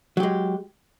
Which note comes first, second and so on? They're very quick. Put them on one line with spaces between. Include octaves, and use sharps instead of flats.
F#3 G4 G#3